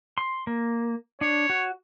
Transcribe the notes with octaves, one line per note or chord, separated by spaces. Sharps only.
C6
A#3
D4 C#5
F#4